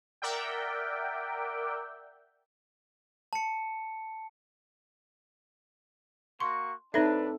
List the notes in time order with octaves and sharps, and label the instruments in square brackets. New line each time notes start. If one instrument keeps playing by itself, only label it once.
[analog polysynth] A#4 D5 E5 F#5 G5
[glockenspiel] A5 C#7
[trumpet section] A#3 F#4 C#6 [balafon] C6
[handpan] C4 A4 [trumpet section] D4 B4 [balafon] D#4 C#5 E5